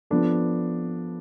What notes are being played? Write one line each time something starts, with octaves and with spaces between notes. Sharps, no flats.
F3 B3 D4 A4